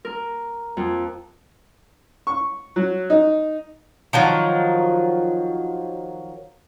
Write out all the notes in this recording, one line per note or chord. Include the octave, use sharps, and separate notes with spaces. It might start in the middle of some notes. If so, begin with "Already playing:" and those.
A#4
F2
C#6
F#3
D#4
D#3 F3 F#3